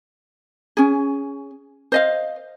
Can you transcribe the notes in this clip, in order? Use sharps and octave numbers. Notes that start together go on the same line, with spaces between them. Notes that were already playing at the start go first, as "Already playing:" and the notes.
C#4 G#4
C5 D#5 F5